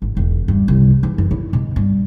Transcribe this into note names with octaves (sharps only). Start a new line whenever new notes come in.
G#1
E1
G2
C2
E3
F#2
E4
B2
G2